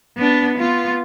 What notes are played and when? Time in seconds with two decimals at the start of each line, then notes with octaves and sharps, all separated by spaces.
0.17 B3 D4
0.58 B3 F4